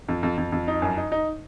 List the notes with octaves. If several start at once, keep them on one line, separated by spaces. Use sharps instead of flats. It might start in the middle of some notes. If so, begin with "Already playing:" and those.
F2
F2
F2
F2
D#4
F#2
D#4
D#4